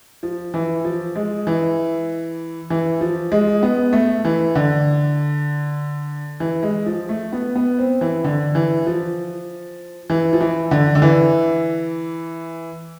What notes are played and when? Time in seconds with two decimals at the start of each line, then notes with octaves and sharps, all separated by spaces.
0.23 F3
0.54 E3
0.85 F3
1.16 G#3
1.47 E3
2.70 E3
3.01 F3
3.32 G#3
3.63 B3
3.93 A3
4.25 E3
4.55 D3
6.40 E3
6.63 G#3
6.86 F3
7.09 A3
7.33 B3
7.56 B3
7.79 C4
8.01 E3
8.24 D3
8.55 E3
8.86 F3
10.10 E3
10.33 F3
10.41 E3
10.71 D3
10.95 D3
11.02 E3